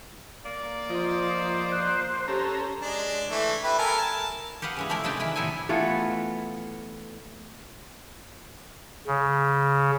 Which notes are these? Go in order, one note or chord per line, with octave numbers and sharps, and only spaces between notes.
A#3 D5
F3 F4 C5 D#5
F#6
C#4 G4 A4 A#5
G#3 D4
E3 A3 E4
E4 G4 B4
A4 A#4 G#5
A5
G4 B4 D#5 F5 F#5
C#3 E3 G#3
F3 G#3 A3 E4 A#4 D5
C3 D4 D#4 B4 G5 A5
D#3 E3 E4 B4 D5
A2 C3 B3 E4 A4 G#5
E3 A3 B3 F4
C#3